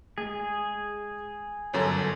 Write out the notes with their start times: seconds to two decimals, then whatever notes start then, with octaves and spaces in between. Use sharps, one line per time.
0.18 G#3 G#4
1.73 G1 F#2 A4 C#5 G#5